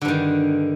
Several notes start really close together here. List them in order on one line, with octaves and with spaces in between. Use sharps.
D3 G2 D#3